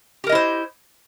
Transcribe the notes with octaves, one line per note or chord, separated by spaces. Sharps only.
E4 G4 A#4 C5 D#5